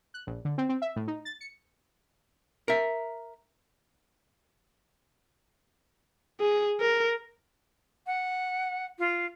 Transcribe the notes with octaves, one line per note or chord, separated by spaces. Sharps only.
F#6
A#1
D3
C4
C4
E5
A2
D#4
A6
C#7
A#4 E5
G#4
A#4
F#5
F4